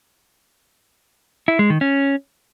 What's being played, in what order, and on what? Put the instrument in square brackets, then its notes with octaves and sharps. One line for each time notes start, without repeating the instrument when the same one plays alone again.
[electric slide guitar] E4
G#3
D#3
C#4